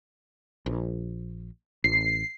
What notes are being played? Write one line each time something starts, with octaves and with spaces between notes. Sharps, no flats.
A#1
A1 C7